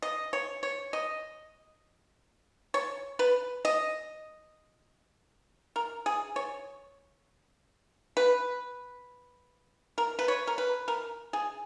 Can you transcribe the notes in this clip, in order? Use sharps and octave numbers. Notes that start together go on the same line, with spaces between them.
D#5
C#5
C#5
D#5
C#5
B4
D#5
A#4
G#4
C#5
B4
A#4
B4
C#5
A#4
B4
A#4
G#4